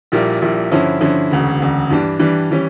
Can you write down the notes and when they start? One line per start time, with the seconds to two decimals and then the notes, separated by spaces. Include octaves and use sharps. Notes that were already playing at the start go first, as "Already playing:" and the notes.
0.12 A#1 A#2 G3 A#3 E4
0.42 A#1 A#2 G3 A#3 E4
0.72 G2 D3 F3 C#4 E4
1.01 G2 D3 F3 C#4 E4
1.31 E1 D2 C#3
1.60 E1 D2 C#3
1.90 G2 E3 G3 D4
2.19 G2 E3 G3 D4
2.51 E3 G3 C#4